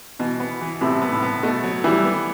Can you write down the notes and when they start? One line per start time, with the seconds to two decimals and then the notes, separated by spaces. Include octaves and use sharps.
0.19 B2 E3
0.40 B3
0.61 E3
0.81 A2 C3 B3
1.02 B3
1.12 A2
1.22 B3
1.43 B2 A3
1.64 F#3
1.84 E3 G3 E4
2.05 B3